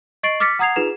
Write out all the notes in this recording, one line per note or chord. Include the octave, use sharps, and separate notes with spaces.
D#5 C#6 A6 C7 D7 F#7
D6 F6 A6 B6 C#7
F#5 A#5 D#6 G#6 C7 F7
D#4 F4 G#4 B4 E7 F7